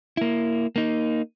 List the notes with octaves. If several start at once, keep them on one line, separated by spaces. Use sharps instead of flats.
A#3 E4
A#3 D#4